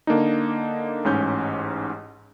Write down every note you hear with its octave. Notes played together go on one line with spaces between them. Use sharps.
D3 A#3 D4 D#4
A1 G#2 C#4 G6